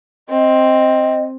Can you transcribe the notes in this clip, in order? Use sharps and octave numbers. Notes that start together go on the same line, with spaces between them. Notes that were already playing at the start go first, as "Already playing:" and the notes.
C4 D#5